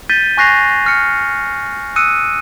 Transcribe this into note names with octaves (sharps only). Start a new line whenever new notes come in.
G6 A6 B6 D#7 G7
G#5 C#6 F#6 A#6 C7 F7
F6 C#7
D#6 E6 F#6 C#7 D#7